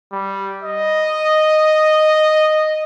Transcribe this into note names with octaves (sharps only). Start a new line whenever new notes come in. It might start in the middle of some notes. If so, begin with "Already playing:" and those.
G3
D#5